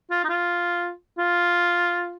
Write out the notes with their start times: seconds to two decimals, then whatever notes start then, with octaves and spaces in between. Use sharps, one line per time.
0.11 F4
0.24 D#4
0.29 F4
1.18 F4